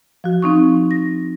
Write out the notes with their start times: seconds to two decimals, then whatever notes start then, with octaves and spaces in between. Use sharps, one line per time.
0.24 F3 F#4
0.42 F3 C4 D#4 C#6
0.91 A#6